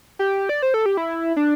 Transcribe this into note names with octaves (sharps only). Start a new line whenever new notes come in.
G4
D5
C5
A4
G4
E4
D4